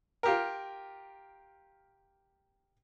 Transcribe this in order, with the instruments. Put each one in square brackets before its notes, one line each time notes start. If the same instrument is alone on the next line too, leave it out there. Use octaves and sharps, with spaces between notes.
[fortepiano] F4 G4 A#4